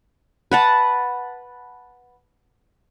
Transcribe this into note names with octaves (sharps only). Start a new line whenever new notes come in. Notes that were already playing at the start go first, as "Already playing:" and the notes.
B4 F#5 A5